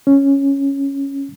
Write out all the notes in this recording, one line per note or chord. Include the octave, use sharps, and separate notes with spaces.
C#4